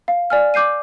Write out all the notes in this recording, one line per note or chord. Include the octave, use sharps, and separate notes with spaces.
F5
D5 G#5 F6
D6 G6 C7 D#7